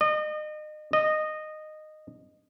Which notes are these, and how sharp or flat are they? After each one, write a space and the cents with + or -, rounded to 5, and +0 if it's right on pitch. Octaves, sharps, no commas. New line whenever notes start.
D#5 -35
D#5 -15